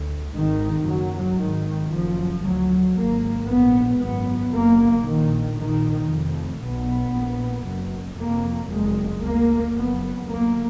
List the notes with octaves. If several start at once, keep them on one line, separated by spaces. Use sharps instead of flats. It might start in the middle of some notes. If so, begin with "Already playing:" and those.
Already playing: D2
G#1 G#2 D#3
F#1 F#2 F#3
G#1 D#3
G#2
F#1 F#2 F3
D2 F#3
G#1 G#2 A#3
A#1 G#2 B3
G#1 F#2 B3
F#1 F#2 A#3
A#1 A#2 D#3
A#1 A#2 D#3
F1 F2
B1 B2 B3
A#1 A#2
F#1 F#2
F1 F2 A#3
F#1 F2 G#3
D2 A#3
F#1 F2 B3
D2 A#3